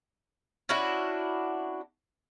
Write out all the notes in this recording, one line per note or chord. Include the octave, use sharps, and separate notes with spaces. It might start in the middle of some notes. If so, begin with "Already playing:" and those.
C#4 D4 E4 F#4